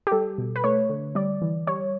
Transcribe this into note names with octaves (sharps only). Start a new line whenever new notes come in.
G4
G3 A4
B2
B4
A3 C#5
D3
G3 D5
E3
G3 C#5